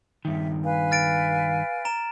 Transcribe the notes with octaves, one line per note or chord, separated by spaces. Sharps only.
G2 D#3 E5
B4 F5 G#5
F6 A6 D7
A#5 D7 E7